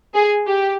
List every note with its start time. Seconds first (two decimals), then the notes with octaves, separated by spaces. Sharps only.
0.15 G#4
0.48 G4